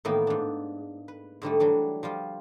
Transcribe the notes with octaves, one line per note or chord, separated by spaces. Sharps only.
A2 D#3 E3 A#3 B3
G#2 D4
B4
G#2 D3 G3 A3
E3 F#3 G3 D4
F3 G3 F4